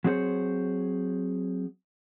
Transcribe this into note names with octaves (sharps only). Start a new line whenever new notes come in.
F#3 C4 G#4 C5 C#5